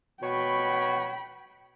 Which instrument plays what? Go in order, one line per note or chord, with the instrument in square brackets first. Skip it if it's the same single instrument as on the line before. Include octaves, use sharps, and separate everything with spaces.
[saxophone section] B2 F#4 C#5 [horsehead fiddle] G5 B5